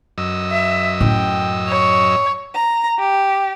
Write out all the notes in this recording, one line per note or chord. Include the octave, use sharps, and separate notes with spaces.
F#2 D#5 E6
E5
A2 C#4 G5
C#5
A#5
G4